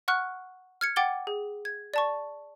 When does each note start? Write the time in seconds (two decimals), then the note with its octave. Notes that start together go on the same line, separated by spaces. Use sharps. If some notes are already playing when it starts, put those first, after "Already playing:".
0.08 F#5 C#6 F6 F#6
0.81 F6 G#6 C#7
0.96 F#5 G5 D6 A6 G7
1.27 G#4
1.65 G#6
1.94 D5 A5 C#6